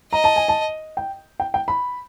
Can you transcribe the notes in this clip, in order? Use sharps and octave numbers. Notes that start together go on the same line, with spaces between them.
D#5 A#5
A5
G#5
A5
G5
G5
G5
B5